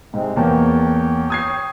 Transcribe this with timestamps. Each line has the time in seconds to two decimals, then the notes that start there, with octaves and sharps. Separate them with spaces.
0.14 G#2 C3 G#3 C4
0.36 E2 A#3 C#5 G5 A5
1.30 D#6 G#6 C7